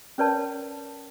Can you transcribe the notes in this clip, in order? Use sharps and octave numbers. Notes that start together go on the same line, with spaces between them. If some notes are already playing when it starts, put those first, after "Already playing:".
C#4 A#4 B4 C#5 D5 A5